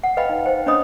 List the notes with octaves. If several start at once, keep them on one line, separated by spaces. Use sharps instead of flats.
F#5
B4 D#5 F5 G5 B5
D#4
C5 G5
C#4 D4 C#5 D#5 B5 D#6